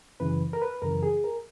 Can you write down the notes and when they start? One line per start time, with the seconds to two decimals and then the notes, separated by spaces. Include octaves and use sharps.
0.20 F#2 C#3 E3 B4
0.53 A#4
0.62 B4
0.82 F#2 C#3 E3 A#4
1.03 G#4
1.24 A#4